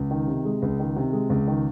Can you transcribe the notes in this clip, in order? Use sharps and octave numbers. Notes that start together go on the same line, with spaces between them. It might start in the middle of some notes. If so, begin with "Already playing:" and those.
Already playing: C#2
D#3
C3
G#3
C#2
D#3
C3
G#3
C#2
D#3